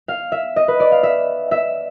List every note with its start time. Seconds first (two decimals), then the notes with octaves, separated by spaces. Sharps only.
0.08 F5
0.32 E5
0.56 D#5
0.68 B4
0.80 D5
0.92 F5
1.03 E5
1.51 E5